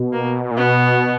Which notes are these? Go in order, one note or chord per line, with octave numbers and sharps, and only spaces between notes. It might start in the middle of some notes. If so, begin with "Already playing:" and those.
Already playing: B2
A#3
A#2
B2 B3